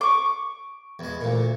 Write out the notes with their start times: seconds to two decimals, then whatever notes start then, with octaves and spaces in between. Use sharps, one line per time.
0.01 C#6 D6
0.99 E2 G#3
1.21 D2 A#2